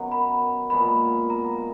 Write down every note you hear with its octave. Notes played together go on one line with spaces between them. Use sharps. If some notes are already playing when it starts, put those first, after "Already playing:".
Already playing: F#2 D#3 F#3 B3
B5
A#2 F3 G#3 B3 B5
A#5